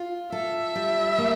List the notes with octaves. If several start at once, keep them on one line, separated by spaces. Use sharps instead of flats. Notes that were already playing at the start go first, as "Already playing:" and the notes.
Already playing: F4
A4 E5
G3
A#3